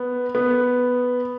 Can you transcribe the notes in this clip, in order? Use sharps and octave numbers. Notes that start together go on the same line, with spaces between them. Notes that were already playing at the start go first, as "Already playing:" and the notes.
Already playing: B3
B3